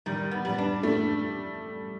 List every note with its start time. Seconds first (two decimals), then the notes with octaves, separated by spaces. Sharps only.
0.06 D#3 G3
0.31 B3
0.45 G3
0.58 D4
0.83 A3 D4